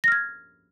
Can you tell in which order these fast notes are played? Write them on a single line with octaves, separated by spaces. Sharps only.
A#6 F6 G#6